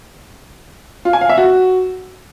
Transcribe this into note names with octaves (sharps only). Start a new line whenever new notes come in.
F4
G#5
F5
E5
F#4